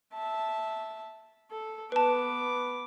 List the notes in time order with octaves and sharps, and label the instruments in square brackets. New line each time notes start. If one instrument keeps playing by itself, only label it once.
[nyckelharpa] E5 A5
A4
[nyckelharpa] B3 D6 [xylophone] B4 A5